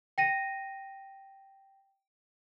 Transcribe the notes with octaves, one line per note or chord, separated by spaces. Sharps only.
G5 A#6 D#7